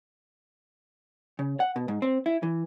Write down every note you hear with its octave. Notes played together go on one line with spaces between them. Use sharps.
C#3
F#5
B2
G#2
C4
E4
E3